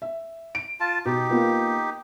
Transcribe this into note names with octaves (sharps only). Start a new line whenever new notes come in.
E5
D7
F4 A5
B2 D#4 G4
A#3 B3 F4